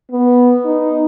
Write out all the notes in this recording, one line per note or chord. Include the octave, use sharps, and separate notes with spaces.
B3
D#4